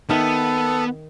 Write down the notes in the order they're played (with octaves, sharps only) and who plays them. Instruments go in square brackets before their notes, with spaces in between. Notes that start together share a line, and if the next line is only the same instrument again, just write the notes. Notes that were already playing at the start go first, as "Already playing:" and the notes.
[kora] D#3 E5 [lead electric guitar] B3 [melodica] A4